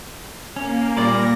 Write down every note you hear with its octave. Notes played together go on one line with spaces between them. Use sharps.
A#3 C#4
A#2 G3 F4 D5 D6 A#6